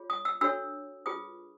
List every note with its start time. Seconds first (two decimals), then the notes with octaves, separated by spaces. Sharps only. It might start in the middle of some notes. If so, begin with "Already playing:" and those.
Already playing: F4 G#4 C#5
0.10 D#6
0.25 E6
0.41 D4 F#4 A4 C#5 E6
1.06 F4 G#4 B4 D#6